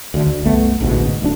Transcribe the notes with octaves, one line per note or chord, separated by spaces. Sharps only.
D2 D3
D2
F#1 C2 A3 B3
A1 D2 G#2 B2
D1 D2 F#3 D4